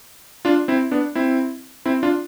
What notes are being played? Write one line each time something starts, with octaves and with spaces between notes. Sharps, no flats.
D4 F4
C4 E4
B3 D4
C4 E4
C4 E4
D4 F4